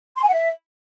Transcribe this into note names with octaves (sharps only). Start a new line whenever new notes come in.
C6
G#5
F#5
E5